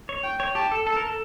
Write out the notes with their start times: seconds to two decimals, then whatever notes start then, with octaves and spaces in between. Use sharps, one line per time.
0.09 C#5
0.24 G5
0.40 C#5
0.55 G4 A5
0.71 A4
0.86 A4 A5
0.97 A#4
1.07 A4